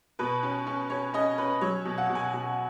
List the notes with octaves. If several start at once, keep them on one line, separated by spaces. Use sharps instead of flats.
B2 B4
C#4
C#4
C#4 C#5
C#4 D#5
C#4 B4
F#3 C#5
B2
F#5
B2
G#5
B2